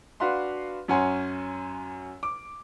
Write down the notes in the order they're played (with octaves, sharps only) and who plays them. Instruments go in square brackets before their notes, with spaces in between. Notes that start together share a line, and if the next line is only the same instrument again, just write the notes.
[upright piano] D4 F#4 B4 F5 C6
F#2 C#4 F#5 G#5 C6
D6